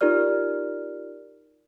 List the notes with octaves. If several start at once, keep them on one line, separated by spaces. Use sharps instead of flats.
D#4 F4 G4 A#4 D5 F6